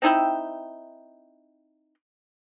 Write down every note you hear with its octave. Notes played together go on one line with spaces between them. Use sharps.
C4 D#4 E4 G5